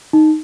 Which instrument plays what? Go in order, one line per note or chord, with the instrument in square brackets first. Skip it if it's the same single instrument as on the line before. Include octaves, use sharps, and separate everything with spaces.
[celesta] D#4